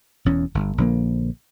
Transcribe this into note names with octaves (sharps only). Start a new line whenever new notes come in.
E1 E2 C#4
G1
A#1 D3 F3 A#3